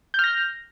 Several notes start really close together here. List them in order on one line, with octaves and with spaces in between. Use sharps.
G6 F6 A#6